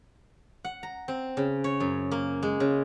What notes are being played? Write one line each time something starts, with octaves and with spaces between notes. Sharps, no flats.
F#5
A#5
C4
C#3
C#5
F#2
A#3
G#3
C#3